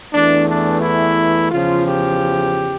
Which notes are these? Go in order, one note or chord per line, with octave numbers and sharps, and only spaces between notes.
E2 E3 A3 D4
D4
E4
E2 C#3 F3 F4
G4